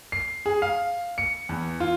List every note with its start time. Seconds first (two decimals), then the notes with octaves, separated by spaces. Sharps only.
0.12 C7
0.46 G#4
0.62 F5
1.18 C#7
1.49 E2
1.80 F4